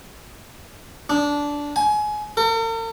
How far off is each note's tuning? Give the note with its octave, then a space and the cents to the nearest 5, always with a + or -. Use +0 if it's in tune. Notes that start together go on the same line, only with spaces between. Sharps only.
D4 -15
G#5 +25
A#4 -45